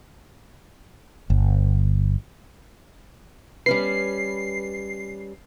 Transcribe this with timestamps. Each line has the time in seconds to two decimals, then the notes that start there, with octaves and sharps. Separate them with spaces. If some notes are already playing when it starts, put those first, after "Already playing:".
1.30 G1
3.66 G3 C#4 B4 C7